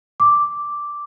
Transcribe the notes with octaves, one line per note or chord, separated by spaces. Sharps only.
D6